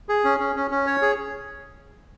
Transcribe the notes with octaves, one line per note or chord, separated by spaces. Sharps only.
G#4
C#4
C#4
C#4
C#4
C#5
G#4